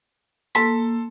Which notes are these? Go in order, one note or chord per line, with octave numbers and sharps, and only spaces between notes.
A#3 A4 A5 C6 B6